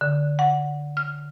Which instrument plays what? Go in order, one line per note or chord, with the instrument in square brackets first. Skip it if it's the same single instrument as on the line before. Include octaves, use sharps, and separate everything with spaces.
[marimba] D3
F#5
F6